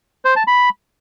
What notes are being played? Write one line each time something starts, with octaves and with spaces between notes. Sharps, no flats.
C5
A5
B5